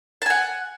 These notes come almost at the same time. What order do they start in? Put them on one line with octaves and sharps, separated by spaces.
A5 G#5 F#5